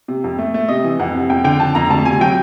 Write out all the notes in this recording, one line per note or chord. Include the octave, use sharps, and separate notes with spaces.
C3
F2
A3
A3
C3 D#5
E3
F2 F#5
C3
F2 G5
D3 G5
F2 A5
F2 A#5
D2 A5
C3 G#5
F#3 G5